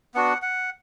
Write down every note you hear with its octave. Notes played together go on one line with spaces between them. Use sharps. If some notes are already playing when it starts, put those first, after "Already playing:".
B3 D4 F#4 F#5
F#5